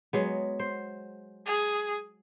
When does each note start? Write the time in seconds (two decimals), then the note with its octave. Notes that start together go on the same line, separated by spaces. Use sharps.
0.13 F#3 G#3 B3
0.59 C5
1.46 G#4